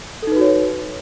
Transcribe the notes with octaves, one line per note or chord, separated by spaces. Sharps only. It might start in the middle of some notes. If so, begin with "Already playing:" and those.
D#4 F#4 A4 B4 C#5